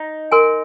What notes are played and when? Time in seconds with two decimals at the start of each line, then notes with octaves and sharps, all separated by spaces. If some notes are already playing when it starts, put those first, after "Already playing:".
Already playing: D#4
0.32 A#4 G#5 C6